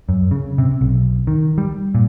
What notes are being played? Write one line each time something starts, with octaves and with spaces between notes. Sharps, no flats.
F#2
C#3
C3
B1
D#3
G3
A#2